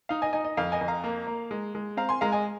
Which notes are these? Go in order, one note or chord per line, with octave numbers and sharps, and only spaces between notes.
D#4 F5
D#5 G#5
D#4 D#5 G#5
D#5
F2 F5
D#5 G#5
F2
F5 A#5
A#3
A#3
G#3
G#3
C4 F5 A#5
G#5 C6
G#3 F5 A#5
D#5 G#5